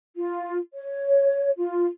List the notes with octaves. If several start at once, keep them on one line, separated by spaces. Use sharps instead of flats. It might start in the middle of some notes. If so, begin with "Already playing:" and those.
F4
C#5
F4